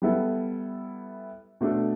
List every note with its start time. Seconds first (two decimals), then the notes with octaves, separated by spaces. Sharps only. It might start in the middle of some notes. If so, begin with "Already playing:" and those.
0.02 G3 B3 E4 A4
1.61 B2 A3 D4 A4